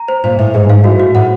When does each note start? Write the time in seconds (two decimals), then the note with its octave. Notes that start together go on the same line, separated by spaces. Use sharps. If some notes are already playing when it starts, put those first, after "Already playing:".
Already playing: A#5
0.08 C5
0.24 A#2 C5
0.39 A2 C5
0.54 G#2 G#4
0.69 G#2 F5
0.84 A2 F#4
1.00 F#4
1.15 A2 F#5